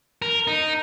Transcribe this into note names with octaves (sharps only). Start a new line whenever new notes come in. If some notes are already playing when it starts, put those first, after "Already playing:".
A#4
D#4